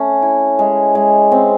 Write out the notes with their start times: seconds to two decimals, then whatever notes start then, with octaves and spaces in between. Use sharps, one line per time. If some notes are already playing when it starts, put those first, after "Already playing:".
Already playing: A3 C#4
0.22 E4
0.59 G#3
0.95 G#3
1.32 C4